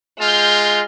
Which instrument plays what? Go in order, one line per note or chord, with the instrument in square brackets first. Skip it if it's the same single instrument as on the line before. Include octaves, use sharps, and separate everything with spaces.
[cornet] G#3 [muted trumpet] F4 [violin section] F6 G6